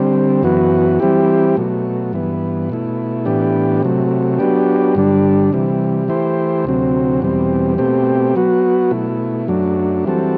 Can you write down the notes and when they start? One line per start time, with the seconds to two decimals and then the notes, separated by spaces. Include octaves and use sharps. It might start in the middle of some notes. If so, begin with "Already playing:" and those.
Already playing: D3 G3 C4
0.43 F#2 E3 B3 F#4
1.00 E3 G3 C4 E4 G4
1.56 B2 F#3 A3
2.13 G2 E3 B3
2.69 B2 A3 E4
3.25 A2 E3 B3 D4 G4
3.83 C3 F#3 A3
4.39 F#3 B3 D4 G4
4.95 G2 D3 G3 D4
5.53 C3 E3 G3
6.08 E3 A3 E4 G4 C5
6.65 D2 C3 F#3 C4
7.22 E2 B2 G3 C4
7.78 B2 A3 C4 G4
8.36 F#3 B3 F#4
8.91 B2 A3 E4
9.48 F#2 F#3 A3 D4
10.04 E3 G3 C4 F#4 A4